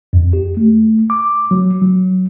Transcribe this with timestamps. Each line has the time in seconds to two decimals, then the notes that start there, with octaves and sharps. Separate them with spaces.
0.13 F2
0.33 G4
0.57 A3
1.10 D6
1.51 F#3
1.82 F#3